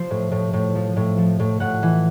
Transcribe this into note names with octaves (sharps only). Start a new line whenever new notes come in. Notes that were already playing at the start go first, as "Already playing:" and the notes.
Already playing: F3 C5
A2
A2
A2
F3
A2
F3
A2
A2 F#5
E3